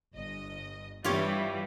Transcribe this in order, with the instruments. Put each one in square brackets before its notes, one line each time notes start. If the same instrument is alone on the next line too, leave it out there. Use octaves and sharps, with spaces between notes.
[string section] G1 D#5
[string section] G2 E3 G3 [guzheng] F4 G4 C#5